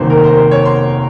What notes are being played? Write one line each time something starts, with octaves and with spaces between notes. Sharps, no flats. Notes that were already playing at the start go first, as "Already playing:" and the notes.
Already playing: F1 D#2 D#3 F#3 A#3 C5
A#4
C5
A#4
C5
C#5
C6